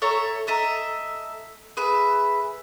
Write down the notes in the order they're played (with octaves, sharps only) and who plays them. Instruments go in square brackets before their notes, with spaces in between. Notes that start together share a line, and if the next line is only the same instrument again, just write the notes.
[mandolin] A4 C#5 E5 A#5
A4 D#5 E5 A#5
G#4 B4 E5